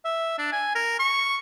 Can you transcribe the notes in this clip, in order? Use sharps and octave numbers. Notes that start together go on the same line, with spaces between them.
E5
D4
G#5
A#4
C#6